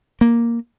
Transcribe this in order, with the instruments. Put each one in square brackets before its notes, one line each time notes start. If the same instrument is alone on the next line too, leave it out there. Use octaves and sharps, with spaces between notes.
[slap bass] A#3